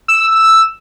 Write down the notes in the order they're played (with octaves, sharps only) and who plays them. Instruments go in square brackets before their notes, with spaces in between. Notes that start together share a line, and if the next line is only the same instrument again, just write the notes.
[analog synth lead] E6